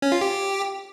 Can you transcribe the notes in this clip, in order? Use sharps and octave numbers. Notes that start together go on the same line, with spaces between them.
C#4
F4
G4